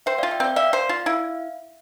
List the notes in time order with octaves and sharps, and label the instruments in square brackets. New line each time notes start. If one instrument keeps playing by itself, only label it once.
[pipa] C5 [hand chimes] E5 G5
[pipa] F4 [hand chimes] D5 F5
[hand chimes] E5 G5
[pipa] C4 [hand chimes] D5 F5
[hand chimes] D5 F5 [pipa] E5
[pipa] C5
F4
[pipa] E4 [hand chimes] F5